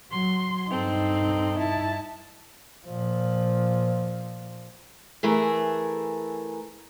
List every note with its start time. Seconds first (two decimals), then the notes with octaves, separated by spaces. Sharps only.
0.12 F#3 C6
0.71 G2 C4 D#4 A4
1.59 E4 A5
2.87 A#2 F3
5.23 E3 A3 G#4 A#4